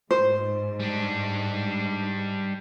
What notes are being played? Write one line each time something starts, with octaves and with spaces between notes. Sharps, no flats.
G#2 C5
G3 D4